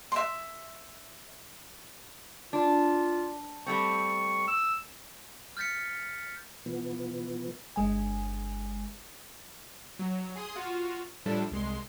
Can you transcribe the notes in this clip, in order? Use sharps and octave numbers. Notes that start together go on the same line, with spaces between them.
E5 C6
D4 F4
G3 A3 C4 C#6
E6
F6 G6 A6 B6 C#7
B2 E3 F3 B3
G1 G#3 G#5
F#3
G#4 C6 D#6
F4 F#4
A2 F3 G3 D4 E4 A4
C2 G#3 C6